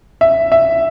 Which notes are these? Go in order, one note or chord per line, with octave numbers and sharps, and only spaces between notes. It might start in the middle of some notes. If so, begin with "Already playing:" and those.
E5
E5